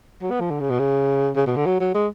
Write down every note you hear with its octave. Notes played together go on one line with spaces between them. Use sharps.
F#3
B3
F3
D3
C#3
B2
C#3
C#3
B2
D3
F#3
F#3
G#3